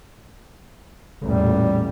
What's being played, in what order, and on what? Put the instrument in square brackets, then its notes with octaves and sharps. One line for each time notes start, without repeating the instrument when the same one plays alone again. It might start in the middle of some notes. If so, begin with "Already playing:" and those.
[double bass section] A1 E2 A#2 [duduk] G3